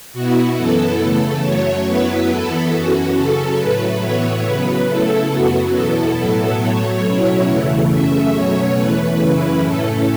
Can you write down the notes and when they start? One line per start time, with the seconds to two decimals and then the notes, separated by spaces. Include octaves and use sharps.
0.13 B2 B3 E4 F#4
0.57 F#2 E3 B3 E4 A4
1.00 C#3 E3 A3 A4
1.43 F#2 F#3 A3 C#5
1.86 F#2 F#3 B3 E4 B4
2.29 E2 E3 B3 E4 A4
2.73 F#2 E3 C#4 F#4
3.16 C#3 F#3 C#4 A4
3.59 A2 F#3 A3 B4
4.02 A2 E3 B3 E4 C#5
4.45 C#3 F#3 B3 B4
4.88 C#3 A3 E4 A4
5.31 F#2 F#3 B3 F#4
5.74 E2 B2 B3 E4 A4
6.18 A2 F#3 B3 E4 A4
6.61 A2 F#3 A3 C#5
7.04 B2 F#3 C#4 E4
7.47 E2 C#3 E3 A3
7.90 F#2 C#3 A3 C#4 E5
8.33 B2 F#3 A3 C#4 C#5
8.76 E2 E3 A3 B4
9.19 F#2 C#3 E3 C#4 E4 B4
9.63 A2 A3 C#4 A4